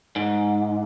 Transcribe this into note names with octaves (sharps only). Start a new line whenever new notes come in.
G#2